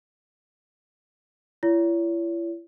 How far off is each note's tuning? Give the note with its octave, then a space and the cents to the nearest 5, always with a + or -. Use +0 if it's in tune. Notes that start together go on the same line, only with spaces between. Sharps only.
E4 +40 C#5 +40